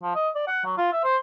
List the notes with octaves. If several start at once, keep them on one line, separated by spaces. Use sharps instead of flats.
F3
D#5
D5
F#5
F#3
F4
E5
C5